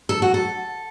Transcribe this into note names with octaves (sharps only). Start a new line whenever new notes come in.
A4
F#4
A4